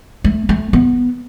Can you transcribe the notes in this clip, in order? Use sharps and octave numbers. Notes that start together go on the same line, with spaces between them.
A3
A3
B3